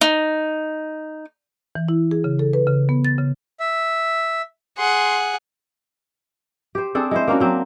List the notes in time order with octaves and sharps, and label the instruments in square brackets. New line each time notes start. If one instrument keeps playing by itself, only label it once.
[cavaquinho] D#4
[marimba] E3
E4
G#4
C#3
A4
B4
C#3
B3
A6
C#3
[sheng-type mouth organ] E5
[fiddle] G#4 F#5 [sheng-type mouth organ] C6
[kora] G4 C5
C4 D4 G#4 A4
G#3 E4 C5
A#3 C#4 D4 F#4
F#3 C4